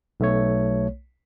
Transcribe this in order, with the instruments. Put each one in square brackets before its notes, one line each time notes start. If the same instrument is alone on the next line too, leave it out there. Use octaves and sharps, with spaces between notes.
[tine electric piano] B1 A3 C#5